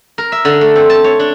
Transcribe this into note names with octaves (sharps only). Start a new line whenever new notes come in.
A#4
E5
D3
A3
C4
A5
C#5
D4